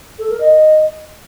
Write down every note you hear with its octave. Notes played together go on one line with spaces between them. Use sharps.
A4
A#4
D#5